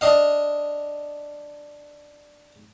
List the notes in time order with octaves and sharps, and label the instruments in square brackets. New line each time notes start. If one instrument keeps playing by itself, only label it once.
[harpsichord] D4 D#5 F5